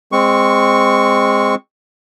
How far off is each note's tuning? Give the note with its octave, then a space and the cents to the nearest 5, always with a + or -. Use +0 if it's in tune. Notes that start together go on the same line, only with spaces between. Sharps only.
G#3 -15 C4 +0 C#6 +0